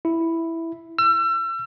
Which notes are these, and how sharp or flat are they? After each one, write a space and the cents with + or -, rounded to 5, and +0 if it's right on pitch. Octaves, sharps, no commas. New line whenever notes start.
E4 +0
E6 +35